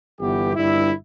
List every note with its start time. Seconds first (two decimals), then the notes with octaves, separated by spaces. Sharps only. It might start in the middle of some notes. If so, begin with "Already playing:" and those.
0.20 G1 G2 E3 B3 G4
0.55 G1 G2 G3 E4